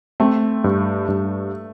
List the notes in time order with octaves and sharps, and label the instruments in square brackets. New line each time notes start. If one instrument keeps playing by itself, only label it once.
[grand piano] A3 [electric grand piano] C4
[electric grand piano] G2
G2